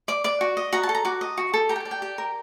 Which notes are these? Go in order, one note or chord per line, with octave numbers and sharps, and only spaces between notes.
D5 D6
D5 D6
F#4
D#5
F#4 A#5
A5
A4
A#5
F#4 D6
D#5
F#4
A4
G4 A#5
G5
A5
D5
G5
G4
A#4